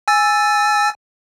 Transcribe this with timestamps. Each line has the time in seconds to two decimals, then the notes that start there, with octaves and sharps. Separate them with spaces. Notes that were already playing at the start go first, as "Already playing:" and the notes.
0.08 G#5 E6 A6